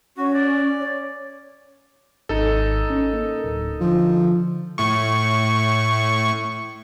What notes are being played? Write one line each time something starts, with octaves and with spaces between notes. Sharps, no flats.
C#4 F#4
D5
C#5
G#1 D#4 A4
C#4
A#3
D1
D3 F3
A2 C#6